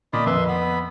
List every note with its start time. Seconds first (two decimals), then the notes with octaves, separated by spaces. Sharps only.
0.13 A#2 D5 D#5 B5
0.26 F2 B4 E5 C6
0.48 B3 B5